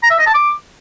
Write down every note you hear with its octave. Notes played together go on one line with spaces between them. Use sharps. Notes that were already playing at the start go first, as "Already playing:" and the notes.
A#5
E5
D#5
A5
D6